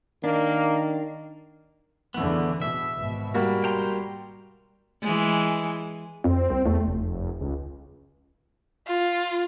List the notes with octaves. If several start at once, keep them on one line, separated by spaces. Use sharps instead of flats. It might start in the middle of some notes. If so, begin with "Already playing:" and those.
D#3 A#3 D4
E2 D3 E3 A3 B3
B2 E5
G#1 B2
G3 A#3 F#4
G5 A#5 C6
E3 G#3
F2 C4
C2
E2 A3
F1
C#2
F4